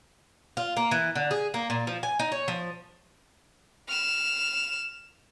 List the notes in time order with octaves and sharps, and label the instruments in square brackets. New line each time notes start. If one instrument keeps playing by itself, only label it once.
[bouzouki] F4
A#3
E3
D3
G#4
A#3
A#2
F3
G#5
D#4
C#5
F3
[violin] F6 E7